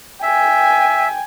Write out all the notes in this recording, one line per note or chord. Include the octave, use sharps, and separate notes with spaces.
E5 G5 G#5